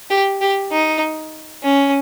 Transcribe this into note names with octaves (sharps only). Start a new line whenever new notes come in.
G4
G4
D#4
C#4